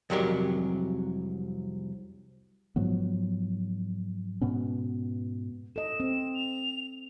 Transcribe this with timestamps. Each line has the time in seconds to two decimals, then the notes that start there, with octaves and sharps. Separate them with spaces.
0.10 C2 F2 F#3 G#3 G4 A#4
2.76 G#2 F3 F#3 B3
4.41 G#2 B2 B3 C#4
5.76 A4 D#5 E7
6.00 C4
6.34 F7